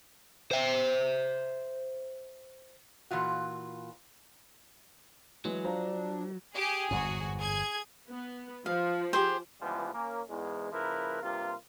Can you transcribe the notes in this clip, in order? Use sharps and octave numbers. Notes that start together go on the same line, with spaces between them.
C5 E5
A#2 E3 F4 F#4
E3 F#3 G#3
F3 D4 A#5
G4 G#4 G#5
G1 E2 G#2 F#4
G#4 G#6
B3
F3 F5
G4 G#4 C5
C#2 E3 F3 G3 G#3 B3
A#3 C#4
E2 G#2 G#3
C#3 F3 A#3 E4 A#4 B4
G2 C3 A#3 F4